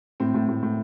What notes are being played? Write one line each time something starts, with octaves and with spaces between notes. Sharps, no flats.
A2 C4
A2
A2
A2